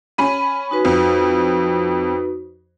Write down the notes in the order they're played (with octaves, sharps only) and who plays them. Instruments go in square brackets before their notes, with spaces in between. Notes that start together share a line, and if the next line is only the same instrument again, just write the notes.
[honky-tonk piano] C#4 B5 D#7
[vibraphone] D#4 F#4 B4
[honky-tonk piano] F2